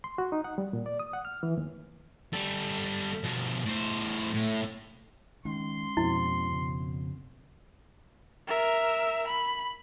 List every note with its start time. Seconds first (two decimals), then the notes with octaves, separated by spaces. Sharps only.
0.04 C6
0.18 F#4
0.32 D#4
0.44 F#5
0.58 G3
0.73 A#2
0.86 D5
0.99 D#6
1.13 F#5
1.25 F6
1.43 E3
1.58 D#2
2.33 G3 A4
3.24 B2 F3
3.66 A2 C5
4.34 A2
5.45 D#3 G#3 C#4 C6
5.97 F2 B2 E4
6.52 C#3
8.48 A#4 E5
9.27 B5